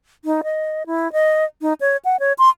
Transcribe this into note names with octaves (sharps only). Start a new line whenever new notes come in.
D#4
D#5
E4
D#5
D#4
C#5
F#5
C#5
C6